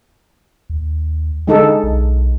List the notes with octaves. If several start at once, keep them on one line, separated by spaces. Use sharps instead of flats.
D#2
D3 G#3 D#4 A4
B1